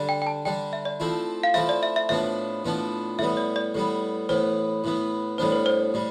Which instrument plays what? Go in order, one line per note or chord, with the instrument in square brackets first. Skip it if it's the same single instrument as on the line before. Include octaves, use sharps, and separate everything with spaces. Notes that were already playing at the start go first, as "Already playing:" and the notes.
Already playing: [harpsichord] D3 G3 D4
[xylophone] G5
G5
A5
[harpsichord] D3 G3 D4 [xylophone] G5
[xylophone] E5
D5
[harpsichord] F3 A3 C4 E4
[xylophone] F5
[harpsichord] F3 A3 C4 E4 [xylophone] E5
[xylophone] D5
E5
E5
[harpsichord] A2 F3 B3 D4 [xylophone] E5
[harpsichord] A2 F3 B3 D4
[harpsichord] A2 G3 B3 [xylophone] E5
[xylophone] D5
D5
[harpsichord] A2 G3 B3
[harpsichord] A2 E3 B3 [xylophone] C5
[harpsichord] A2 E3 B3
[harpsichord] A2 G3 B3 D4 [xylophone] C5
[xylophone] B4
C5
[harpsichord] A2 G3